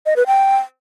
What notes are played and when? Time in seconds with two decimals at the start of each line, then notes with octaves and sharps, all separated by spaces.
0.06 D#5
0.16 B4
0.27 G5